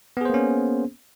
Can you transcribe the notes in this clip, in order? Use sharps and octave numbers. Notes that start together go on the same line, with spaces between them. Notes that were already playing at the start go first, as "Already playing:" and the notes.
A#3 B3 C#4 G#4 C5